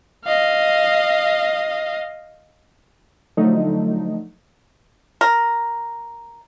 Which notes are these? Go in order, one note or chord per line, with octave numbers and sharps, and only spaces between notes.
D#5 F5
D3 F3 F#3 A3 D#4
A#4